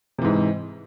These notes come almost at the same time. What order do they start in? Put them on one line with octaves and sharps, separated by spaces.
C3 E3 G#2